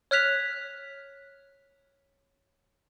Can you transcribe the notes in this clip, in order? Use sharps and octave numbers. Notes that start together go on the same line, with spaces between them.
C#5 F6 F#6 B6 F7